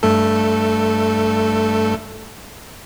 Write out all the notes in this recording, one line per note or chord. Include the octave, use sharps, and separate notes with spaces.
G2 A3 A4